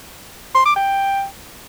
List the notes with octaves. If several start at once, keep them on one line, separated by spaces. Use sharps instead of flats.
C6
D6
G5